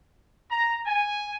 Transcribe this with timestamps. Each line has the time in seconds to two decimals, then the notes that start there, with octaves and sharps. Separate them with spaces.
0.51 A#5
0.86 G#5